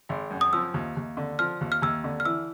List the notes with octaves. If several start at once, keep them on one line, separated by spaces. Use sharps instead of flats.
G#1
F#2
D#6
F3 E6
D#2
D#2
D3
F3 F6
D#2
F6
D#2 E6
D3
F6
E3 E6